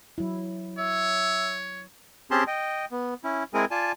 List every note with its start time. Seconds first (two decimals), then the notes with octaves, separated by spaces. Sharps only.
0.18 F#3 E4
0.78 C#5 E5
2.31 C4 C#4 G4 G#4 A5 C6
2.47 D#5 G5
2.91 B3
3.24 C#4 E4
3.54 G#3 C4 E4 G#4 A#4 G#5
3.71 F4 D5 G#5 A5